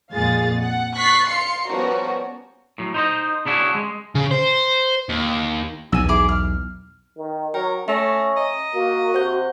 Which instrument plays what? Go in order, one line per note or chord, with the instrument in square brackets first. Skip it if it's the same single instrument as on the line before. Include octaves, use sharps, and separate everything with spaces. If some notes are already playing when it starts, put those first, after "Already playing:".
[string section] F2 A#2 G#3 G#4 F5 A6
F#5
C#6 F#6 A6 B6 C7
F5 C6 C7 C#7
F3 G3 B3 C#4 F#4 A#4
[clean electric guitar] A2 F#3
D#4 C5 D#5
C#3 D4 E4 F#4 G#4
G#3
[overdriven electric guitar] C#3
C5
D#2
[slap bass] B1 E2 [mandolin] G#5 E6
[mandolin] E4 G#4 D6
F6
[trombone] D#3
[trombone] F#3 [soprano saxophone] A#4 [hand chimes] G5
[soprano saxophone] A3 [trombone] C#4 [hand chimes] E5 E6 A#6
[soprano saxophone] D#5 [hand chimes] A#5
[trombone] A#3 [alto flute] F#4
[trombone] C3 [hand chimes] C5 F#5 G6